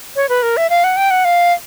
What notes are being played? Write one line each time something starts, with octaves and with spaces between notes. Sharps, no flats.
C#5
B4
A#4
E5
F5
F#5
G5
F#5
F5